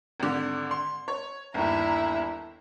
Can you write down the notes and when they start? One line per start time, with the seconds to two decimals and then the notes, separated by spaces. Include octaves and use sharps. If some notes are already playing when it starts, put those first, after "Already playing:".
0.20 G#1 D3
0.71 C6
1.08 C#5
1.54 G1 D#2 E4 A#5